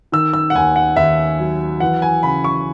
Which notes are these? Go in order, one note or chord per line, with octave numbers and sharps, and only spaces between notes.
D#3 E6
E6
F#5
D#2 G#5
F#5
D#2 E5
F#3
E3 F#5
G#5
C#3 B5
C#6